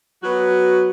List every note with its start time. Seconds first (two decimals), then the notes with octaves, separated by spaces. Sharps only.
0.23 F#3 B3 F#4